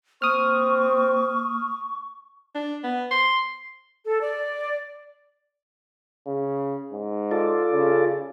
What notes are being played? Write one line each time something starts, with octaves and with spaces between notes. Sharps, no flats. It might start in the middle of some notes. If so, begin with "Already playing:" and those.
A#3 C4 C#6 D#6 F6
D4
B3
C6
A4
D5
C#3
G#2
F4 A4 D5
C#3